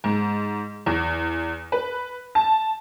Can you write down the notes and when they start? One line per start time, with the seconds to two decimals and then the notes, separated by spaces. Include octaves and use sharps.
0.04 G#2
0.86 E2
1.72 B4
2.35 A5